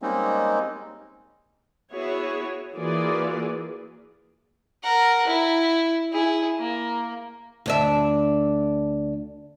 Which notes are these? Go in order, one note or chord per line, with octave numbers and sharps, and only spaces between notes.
G3 G#3 A#3 C4 C#4 D#4
B3 E4 F#4 G#4 C#5
E3 A#3 F4 F#4 G#4 D5
A#4 F#5
E4
E4 G#4
A#3
D2 D4 E5